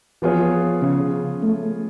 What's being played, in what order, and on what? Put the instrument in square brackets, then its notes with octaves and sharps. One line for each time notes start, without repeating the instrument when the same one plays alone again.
[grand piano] F3 B3 F4 G#4 C#5
[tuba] C#3
A3